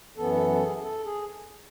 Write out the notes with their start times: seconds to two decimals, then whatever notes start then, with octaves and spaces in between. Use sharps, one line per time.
0.17 F#2 E3 B3 A4
0.34 A4
0.50 A4
0.66 G#4
0.77 G#4
0.82 A4
1.05 G#4